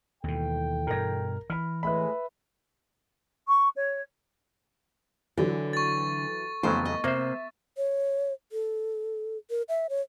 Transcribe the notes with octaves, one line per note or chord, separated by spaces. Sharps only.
D#2 B2 E3 A4 G5
G2 B2 A#4 A#6
E3 B5 F6
A2 G#3 B4 E5 B5
C#6
C#5
D3 E3 F#3
C#6 A6
F2 C#3 E3 F#3 A3 B3 C5
D#5
C3 A#3 C5 E5
C#5
A4
A#4
E5
C#5